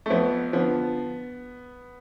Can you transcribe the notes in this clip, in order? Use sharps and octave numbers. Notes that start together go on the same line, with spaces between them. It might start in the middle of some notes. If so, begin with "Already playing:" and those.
A3
F2 B3
D3 F3 B3